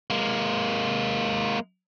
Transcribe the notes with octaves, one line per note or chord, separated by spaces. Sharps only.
G#3 A#3